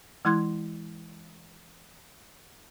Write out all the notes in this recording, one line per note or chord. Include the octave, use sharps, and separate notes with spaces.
E3 G#3 E4 C6 F#6 G#6